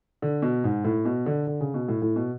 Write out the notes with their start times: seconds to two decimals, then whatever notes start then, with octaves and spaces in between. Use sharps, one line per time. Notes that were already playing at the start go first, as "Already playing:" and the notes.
0.22 D3
0.42 B2
0.64 G#2
0.84 A2
1.05 B2
1.26 D3
1.47 D3
1.61 C#3
1.74 B2
1.88 A2
2.02 A2
2.16 B2